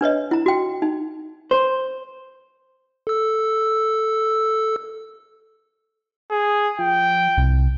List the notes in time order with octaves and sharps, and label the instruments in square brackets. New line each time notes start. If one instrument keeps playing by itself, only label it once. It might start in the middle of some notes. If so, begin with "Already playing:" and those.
[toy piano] D4 B4 C#5 D#5
E4 A#5
F#4 G5
D#4
[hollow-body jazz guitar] C5
[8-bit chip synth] A4 E6
[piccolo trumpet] G#4
[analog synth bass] F3 [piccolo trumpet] G5
[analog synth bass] C2